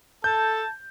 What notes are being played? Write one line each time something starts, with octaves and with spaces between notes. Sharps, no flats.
A4 A5 G6